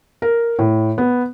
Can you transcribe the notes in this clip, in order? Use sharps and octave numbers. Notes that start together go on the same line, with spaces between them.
A#4
A2
B3